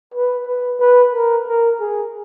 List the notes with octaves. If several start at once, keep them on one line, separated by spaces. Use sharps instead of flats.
B4
B4
B4
A#4
A#4
G#4